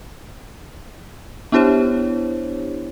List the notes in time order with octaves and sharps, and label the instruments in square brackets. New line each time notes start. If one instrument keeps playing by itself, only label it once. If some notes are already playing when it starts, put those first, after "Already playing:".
[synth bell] B3 D4 E4 G4 C5 C#5